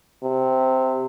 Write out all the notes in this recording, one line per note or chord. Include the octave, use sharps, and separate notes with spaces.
C3